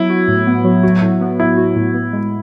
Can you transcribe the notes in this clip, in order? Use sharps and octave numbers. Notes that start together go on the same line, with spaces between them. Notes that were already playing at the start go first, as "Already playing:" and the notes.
Already playing: F#3 B3 E4
F#4
A2
B3
F#3
F#4
A2
B3
F#3 E4
F#4
A2
B3
G#3